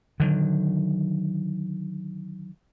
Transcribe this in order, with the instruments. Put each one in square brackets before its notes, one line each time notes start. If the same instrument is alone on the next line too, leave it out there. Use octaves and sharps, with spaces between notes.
[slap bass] D3 D#3 F#3